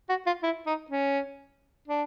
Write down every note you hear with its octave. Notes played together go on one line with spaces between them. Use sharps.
F#4
F4
E4
D#4
C#4
D4